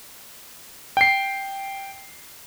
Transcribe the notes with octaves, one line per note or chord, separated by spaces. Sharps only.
G5 C7